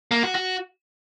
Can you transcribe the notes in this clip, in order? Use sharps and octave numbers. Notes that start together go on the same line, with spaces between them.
A#3
F#4
F#4